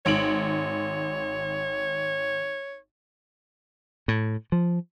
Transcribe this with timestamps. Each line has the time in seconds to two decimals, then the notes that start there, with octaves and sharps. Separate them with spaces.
0.06 G#1 C#5 D7 F#7
4.08 A2
4.52 F3